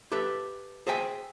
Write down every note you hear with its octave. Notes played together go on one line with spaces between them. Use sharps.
G4 A4 B4 E5
G#4 C5 D#5 E5 G5 G#5